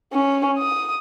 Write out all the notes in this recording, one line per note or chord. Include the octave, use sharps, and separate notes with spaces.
C#4
D#6